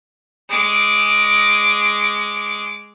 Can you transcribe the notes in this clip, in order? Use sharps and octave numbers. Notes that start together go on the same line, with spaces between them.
G#3 D6